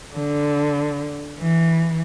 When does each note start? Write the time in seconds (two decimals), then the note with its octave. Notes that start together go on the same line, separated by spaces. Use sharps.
0.15 D3
1.39 E3